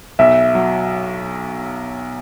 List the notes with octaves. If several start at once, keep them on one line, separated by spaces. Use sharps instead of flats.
B1 E5
F#3